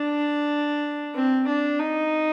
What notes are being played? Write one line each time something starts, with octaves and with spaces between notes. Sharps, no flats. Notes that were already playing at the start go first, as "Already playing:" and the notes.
Already playing: D4
C4
D4
D#4